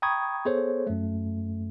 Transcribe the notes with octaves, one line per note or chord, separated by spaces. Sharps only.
G5 A#5 B5 C#6 D#6 G#6
B3 G#4 A4 C5 C#5
F#2 A3